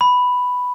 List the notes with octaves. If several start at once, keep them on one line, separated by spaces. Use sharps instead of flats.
B5